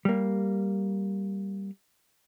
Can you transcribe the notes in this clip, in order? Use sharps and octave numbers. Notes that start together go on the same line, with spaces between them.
G3 A#3